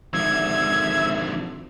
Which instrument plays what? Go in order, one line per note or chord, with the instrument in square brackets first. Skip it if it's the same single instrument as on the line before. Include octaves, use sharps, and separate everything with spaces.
[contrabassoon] G#1 [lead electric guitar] D3 F3 [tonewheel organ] E5 [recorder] G#6